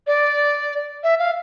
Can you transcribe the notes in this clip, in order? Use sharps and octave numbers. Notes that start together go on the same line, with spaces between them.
D5
E5
F5